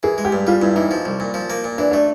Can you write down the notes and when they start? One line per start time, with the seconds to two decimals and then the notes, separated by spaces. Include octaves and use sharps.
0.03 E3 G#4
0.18 G#3
0.25 G4
0.32 G2
0.47 G3 F4
0.62 G2 E4
0.76 E3 D#4
0.91 F3
1.05 C2
1.20 A#2
1.34 F3
1.50 A#3
1.64 A#2
1.78 E3 D4
1.91 A3 D4